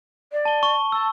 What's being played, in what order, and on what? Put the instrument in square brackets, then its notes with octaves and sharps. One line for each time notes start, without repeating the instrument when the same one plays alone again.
[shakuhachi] D5
[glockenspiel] A5 G7
C#6
[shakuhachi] A5 [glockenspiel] E6